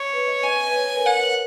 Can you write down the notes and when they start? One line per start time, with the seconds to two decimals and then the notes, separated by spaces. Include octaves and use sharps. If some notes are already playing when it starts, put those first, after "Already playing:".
Already playing: C#5
0.13 B4
0.27 D#5
0.43 G#5
0.70 B4
0.75 C#5
0.85 B4
0.96 A#4
1.06 F#5